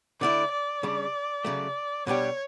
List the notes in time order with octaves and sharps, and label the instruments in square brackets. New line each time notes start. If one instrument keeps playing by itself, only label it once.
[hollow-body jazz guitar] D3 A3 E4 [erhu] D5
[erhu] D5
[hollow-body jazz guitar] C#3 G3 D4
C#3 F#3 A3
[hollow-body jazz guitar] B2 G3 D4 G4 [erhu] C#5